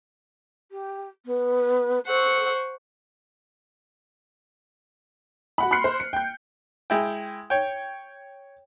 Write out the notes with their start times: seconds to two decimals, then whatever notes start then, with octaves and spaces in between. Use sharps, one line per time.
0.71 G4
1.25 B3
2.07 A4 C5 F#5 C#6
5.58 F#4 F#5 B5
5.71 B5 C6 F6 F#6 C7 C#7
5.84 C5
6.00 C#7
6.13 G5 G6
6.90 G#3 E4 G5
7.50 C#5 G5